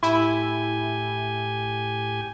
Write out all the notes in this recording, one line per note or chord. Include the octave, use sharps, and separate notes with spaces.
A2 E4 G4 G#5